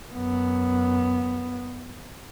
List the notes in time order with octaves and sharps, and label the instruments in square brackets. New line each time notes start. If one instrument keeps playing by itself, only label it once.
[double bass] F#2 B3